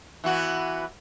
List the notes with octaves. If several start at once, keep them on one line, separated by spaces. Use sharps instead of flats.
E3 B3 F#4